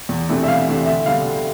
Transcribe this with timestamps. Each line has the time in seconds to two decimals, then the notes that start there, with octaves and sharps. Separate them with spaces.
0.09 E2
0.29 C3 E3 A3 D4
0.43 E5
0.48 E2 F5
0.68 C3 E3 A3 D4
0.86 D2 E5
1.06 D3 G3 D4 F5
1.26 D2